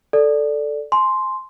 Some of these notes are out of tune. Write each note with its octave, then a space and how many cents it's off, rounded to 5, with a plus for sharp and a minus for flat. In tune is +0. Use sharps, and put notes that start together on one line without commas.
A4 +0 D5 +0
G#5 +40 C6 +0